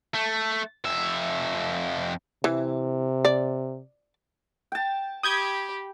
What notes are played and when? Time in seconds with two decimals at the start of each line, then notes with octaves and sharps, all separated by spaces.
0.14 A3
0.85 F2 E5
2.44 C3 E3
3.25 D5
4.72 G5 A5
5.23 G4 B5 D#6 G6 G#6